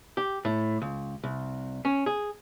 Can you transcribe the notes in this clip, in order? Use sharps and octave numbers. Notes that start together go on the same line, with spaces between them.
G4
A2
C#2
C2
C#4
G#4